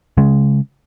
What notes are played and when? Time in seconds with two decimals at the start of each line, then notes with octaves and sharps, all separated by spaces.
0.17 C#3 G#3